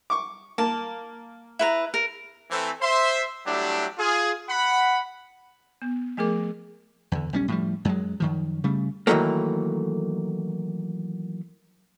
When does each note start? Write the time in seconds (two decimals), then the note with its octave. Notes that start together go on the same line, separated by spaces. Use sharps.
0.10 C#6 D6
0.58 A#3 A5
1.59 E4 B4 A#5
1.94 A#4
2.51 E3 A3 C4
2.82 C5 E5 C6
3.46 F#3 G3 A3 D4 E4 G4
3.98 F4 G#4
4.49 F#5 B5
5.82 B3
6.17 F3 A3 G#4 A#4 D6
7.12 E2 D3
7.33 B1 G3 C#4
7.48 A2 F3 G3
7.85 F#2 F#3 G#3
8.20 F#2 D#3 F3
8.64 C#3 G3 A3
9.07 D#3 E3 F#3 A3 A#3